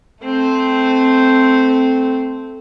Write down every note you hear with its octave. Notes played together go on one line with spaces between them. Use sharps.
A3 C4